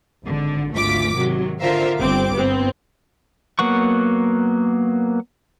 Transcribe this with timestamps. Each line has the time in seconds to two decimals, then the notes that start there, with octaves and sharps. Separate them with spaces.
0.25 G#1 D3
0.73 G#1 D2 A3 F4 D6 B6
1.16 C3 D#3 F#3
1.60 D3 F4 A#4 C5 E5 F5
1.99 G1 G2 C4 D6
2.34 G1 B3 C4
3.59 F#3 A#3 B3 F#5 C#6